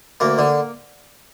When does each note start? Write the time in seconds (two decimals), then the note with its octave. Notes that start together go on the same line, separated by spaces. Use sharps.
0.20 D2 A#3
0.38 D3